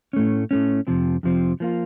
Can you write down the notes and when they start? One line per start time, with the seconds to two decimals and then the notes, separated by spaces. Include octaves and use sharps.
0.13 A2 A3 C#4
0.51 A2 A3 C#4
0.87 F2 C3 F3 C4
1.23 F2 C3 F3 C4
1.60 F3 A#3 F4